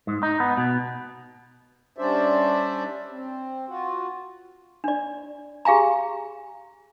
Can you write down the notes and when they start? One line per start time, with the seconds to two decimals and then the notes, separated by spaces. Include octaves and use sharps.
0.07 G#2
0.23 D#4
0.40 B3
0.57 B2
1.98 G3 C#4 D4 C5 D5 E5
3.11 C4
3.68 F4 F#4
4.84 D4 D5
5.65 G4 G#4 F5 G#5 A#5